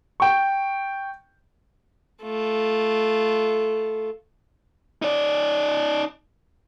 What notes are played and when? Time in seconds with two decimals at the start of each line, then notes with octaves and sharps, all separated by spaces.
0.20 G5 C#6
2.23 A3 F4
5.02 D#4 D5